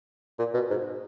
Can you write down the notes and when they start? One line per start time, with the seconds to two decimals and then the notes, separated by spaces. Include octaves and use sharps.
0.39 A#2
0.54 B2
0.70 G#2